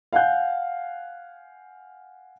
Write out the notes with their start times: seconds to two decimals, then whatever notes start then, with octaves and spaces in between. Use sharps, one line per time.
0.13 F5 F#5 G#5 F#6 G6